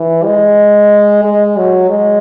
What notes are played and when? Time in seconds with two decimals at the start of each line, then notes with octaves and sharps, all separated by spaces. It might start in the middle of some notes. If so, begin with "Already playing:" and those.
Already playing: E3
0.24 G#3
1.24 G#3
1.57 F#3
1.89 G#3